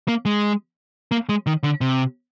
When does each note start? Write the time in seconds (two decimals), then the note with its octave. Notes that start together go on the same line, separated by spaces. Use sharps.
0.08 A#3
0.25 G#3
1.11 A#3
1.29 G#3
1.47 D#3
1.64 D3
1.81 C3